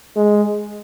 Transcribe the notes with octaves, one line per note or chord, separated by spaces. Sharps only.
G#3